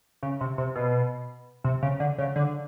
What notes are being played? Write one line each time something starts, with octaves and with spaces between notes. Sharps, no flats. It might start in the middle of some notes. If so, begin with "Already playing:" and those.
C#3
C3
C3
B2
C3
C#3
D3
C#3
D3